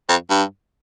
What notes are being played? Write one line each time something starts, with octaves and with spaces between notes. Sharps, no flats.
F2
G2